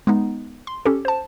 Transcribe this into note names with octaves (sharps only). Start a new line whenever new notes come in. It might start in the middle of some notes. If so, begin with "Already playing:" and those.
G#3 B3 D#4
C6
C#4 G4 A4
C5 A5